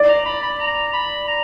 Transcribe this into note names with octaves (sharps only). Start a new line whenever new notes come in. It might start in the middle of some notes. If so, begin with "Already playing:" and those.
Already playing: D5
A#5
B5
B5
A#5
B5
A#5